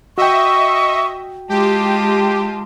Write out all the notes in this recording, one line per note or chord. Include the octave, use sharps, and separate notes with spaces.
F#4 D#5 E5 G5 C#6
G#3 F4 G4 A5